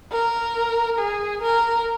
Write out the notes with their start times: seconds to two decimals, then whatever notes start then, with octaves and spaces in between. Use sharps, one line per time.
0.12 A#4
0.99 G#4
1.42 A#4